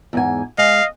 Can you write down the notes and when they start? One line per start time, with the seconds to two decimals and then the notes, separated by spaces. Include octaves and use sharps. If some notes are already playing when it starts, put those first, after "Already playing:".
0.13 E2 G#2 G#5
0.58 G#3 D#5 F5